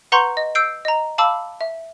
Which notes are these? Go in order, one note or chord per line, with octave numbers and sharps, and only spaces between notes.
B4 F#5 A#5 C6 C#6 G6
D#5
E6 G6 C7 D7
D#5 A#5
F5 A5 B5 D6 E6
E5